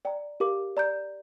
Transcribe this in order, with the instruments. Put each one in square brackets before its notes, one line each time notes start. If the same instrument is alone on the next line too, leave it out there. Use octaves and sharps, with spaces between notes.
[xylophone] D5 G5 A#5
G4 A#4 F5 D6
D5 A#5 G6